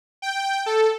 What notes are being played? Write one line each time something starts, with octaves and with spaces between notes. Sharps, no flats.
G5
A4